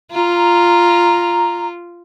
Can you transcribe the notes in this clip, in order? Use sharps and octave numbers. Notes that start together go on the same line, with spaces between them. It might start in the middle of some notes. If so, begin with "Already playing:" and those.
F4 A#5